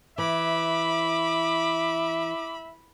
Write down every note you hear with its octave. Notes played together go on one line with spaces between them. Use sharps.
E3 E5 B5 D6